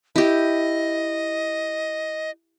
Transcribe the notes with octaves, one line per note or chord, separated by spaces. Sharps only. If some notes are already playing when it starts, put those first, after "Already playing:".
E4 G4 D#5